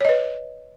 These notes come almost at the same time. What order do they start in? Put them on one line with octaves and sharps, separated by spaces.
C#5 D#5 B4